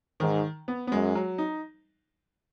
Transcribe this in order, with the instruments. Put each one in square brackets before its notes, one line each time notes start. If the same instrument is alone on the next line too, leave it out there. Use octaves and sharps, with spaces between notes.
[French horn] G#2 [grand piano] D#3
[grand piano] B3
B3
[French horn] F#2 [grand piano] G#3
[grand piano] F#3
D#4